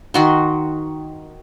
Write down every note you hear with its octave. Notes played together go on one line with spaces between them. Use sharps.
D#3 F#4 C6